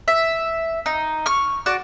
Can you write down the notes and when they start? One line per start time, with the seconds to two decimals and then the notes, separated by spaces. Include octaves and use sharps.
0.08 E5
0.86 D#4
1.26 C#6 F6
1.66 F#4 D5 F#6